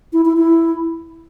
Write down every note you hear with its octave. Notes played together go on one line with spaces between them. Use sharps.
E4
E4
E4